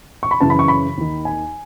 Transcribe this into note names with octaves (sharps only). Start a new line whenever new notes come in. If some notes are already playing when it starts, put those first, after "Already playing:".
C#6
B5
F#2 C#3 E3 A5
B5
C#6
B5
D#2 D#3
G#5